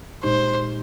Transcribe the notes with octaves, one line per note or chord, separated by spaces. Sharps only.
A#2 G#3 D#4 G4 C5